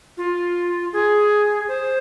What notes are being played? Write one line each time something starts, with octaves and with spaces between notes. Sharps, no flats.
F4
G#4
C5